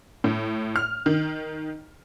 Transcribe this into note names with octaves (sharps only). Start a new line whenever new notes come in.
A2
F6
D#3